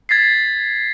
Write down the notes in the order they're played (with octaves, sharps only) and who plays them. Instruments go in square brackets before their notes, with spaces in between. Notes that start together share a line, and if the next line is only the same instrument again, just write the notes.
[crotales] G#6 A6 B6 C7